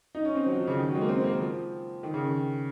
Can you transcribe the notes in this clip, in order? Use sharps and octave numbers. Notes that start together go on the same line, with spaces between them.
D#4
C#4
C4
F#3
F3
C#3
D#3
F#3
G#3
A#3
C4
A#3
F3
D#3
C#3
D#3